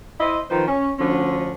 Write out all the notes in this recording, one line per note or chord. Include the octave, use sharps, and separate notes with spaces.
E4 C5 D#5
D#3 F3 B4 C5
C#4
D2 D3 F3 C#4